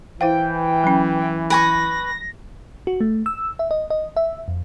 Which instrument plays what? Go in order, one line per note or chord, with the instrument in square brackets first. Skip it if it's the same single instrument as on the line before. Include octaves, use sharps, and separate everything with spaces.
[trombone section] E3 [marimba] E4 C5 F5 [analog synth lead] G5
[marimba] F#3 C#4
[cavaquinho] B4 G#5 C#6 [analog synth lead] A#6
[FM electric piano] F#4
A3
E6
E5
D#5
D#5
E5
F2